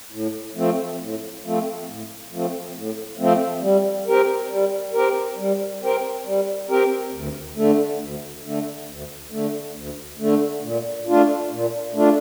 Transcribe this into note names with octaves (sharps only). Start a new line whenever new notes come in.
A2
F3 A3 C4
A2
F3 A3 C4
A2
F3 A3 C4
A2
F3 A3 C4
G3
C4 G4 A#4
G3
C4 G4 A#4
G3
C4 G4 A#4
G3
C4 G4 A#4
D2
D3 A3
D2
D3 A3
D2
D3 A3
D2
D3 A3
A#2
A3 D4 F4
A#2
A3 D4 F4